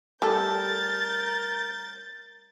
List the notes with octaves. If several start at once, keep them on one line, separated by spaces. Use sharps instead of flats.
G3 A3 A4 A#4 G6 A6